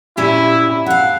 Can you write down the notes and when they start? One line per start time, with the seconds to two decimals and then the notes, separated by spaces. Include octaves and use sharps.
0.17 A#2 C#4 E4 G4
0.86 D#2 F5 F#5